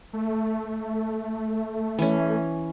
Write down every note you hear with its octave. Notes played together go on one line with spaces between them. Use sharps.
A3
E3 C#4